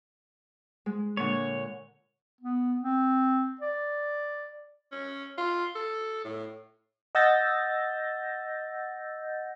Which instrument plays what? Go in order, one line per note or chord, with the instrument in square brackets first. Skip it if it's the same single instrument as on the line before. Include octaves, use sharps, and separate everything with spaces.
[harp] G#3
[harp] A#2 D3 [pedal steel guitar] C#5
[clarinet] B3
C4
D5
[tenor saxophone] C#4
F4
A4
A2
[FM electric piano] D#5 F#5 E6 G6 A6 A#6